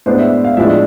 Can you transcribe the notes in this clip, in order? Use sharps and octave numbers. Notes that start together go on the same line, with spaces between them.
A2 G#3 B3 D4 C5
E5
F5
A2 F3 G#3 D4 E5